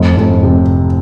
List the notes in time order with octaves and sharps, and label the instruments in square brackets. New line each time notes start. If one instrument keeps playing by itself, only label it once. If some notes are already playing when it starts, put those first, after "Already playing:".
Already playing: [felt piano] F1
F1
C3